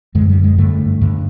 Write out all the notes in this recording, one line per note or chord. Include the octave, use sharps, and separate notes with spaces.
F#2 D3 G#3
G3
G#3
G2 D3 A3
G2 D3